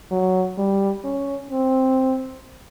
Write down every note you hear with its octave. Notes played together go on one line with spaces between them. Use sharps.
F#3
G3
C#4
C4